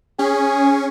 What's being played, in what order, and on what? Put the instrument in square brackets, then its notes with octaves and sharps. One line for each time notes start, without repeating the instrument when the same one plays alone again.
[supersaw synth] C#4 [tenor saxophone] G#4